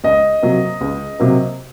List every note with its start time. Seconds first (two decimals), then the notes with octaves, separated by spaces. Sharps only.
0.04 C#2 D#5
0.42 C3 F#3 A#3
0.81 C#2
1.20 C3 F#3 A#3